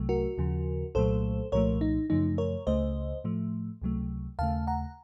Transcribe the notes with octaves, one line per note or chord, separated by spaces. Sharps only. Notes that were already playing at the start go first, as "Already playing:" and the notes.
Already playing: C2 C3 F#3 A3
F#4 A#4
D#2 C#3 F3
C2 A#2 F#3 A3 A4 C5
C2 A#2 F3 A3 A#4 C#5
D#4
F#2 C#3 F3 A3 D#4
A#4 C#5
C#2 C#3 A3 C5 D#5
A2 F3 A3
C#2 C3 F#3 A3
D#2 C#3 A3 F5 A5
F#5 A#5